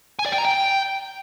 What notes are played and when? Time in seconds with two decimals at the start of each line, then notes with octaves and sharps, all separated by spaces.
0.19 G#5
0.26 D5
0.32 G5
0.38 A#5
0.45 G5